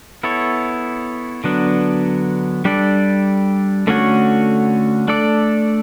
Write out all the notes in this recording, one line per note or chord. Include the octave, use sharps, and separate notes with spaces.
B3 E4 A4 C#5
D3 F#3 B3 D4
G3 D4 A4 D5
D3 A3 C#4 F#4 C#5
A3 D4 A4 D5